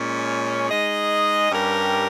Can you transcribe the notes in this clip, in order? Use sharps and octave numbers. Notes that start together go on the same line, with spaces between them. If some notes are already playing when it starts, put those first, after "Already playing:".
Already playing: A#2 G#3 C#4
G#3 D#4 G#4 D#5
G2 G3 C#4 G4 A#4